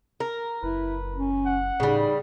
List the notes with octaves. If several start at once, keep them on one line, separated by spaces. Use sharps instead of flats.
A#4
F#1 E4 B4
C#4
F#5
A2 C#3 G3 D#4